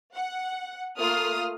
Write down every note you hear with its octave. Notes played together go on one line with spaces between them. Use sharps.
F#5
A3 A#3 F4 D#6 F6